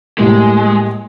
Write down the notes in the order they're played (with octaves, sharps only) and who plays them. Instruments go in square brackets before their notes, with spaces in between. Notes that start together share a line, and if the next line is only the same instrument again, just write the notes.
[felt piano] A2 G3 A#3 [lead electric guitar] G#3